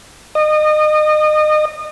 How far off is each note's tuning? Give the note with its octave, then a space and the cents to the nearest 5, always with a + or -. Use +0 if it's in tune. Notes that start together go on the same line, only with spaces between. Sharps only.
D#5 -30